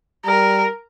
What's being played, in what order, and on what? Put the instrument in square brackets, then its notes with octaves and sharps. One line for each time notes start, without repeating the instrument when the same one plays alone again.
[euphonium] G3 [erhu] A#4